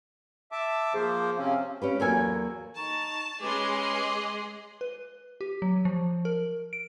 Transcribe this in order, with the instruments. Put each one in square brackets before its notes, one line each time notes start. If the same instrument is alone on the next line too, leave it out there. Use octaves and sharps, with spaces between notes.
[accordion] E5 A5 D6
[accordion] F3 A#3 C5 [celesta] G#4
[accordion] C3 C4 C#4 [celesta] F5
[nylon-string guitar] C#4 G4 B4
E2 F#3 A#3 A4 C#5 G#5
[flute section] D#4 A#5 C#6 [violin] A5
[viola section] G#3 C6 [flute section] C#4 B4 [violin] G#4 D#5 [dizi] D6
[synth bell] B4
G4
F#3
F3
A#4
D7